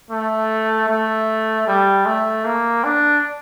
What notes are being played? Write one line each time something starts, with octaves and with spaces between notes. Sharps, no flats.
A3
A3
G3
A3
A#3
D4